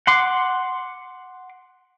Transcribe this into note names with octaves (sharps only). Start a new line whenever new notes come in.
F#5 C6 D6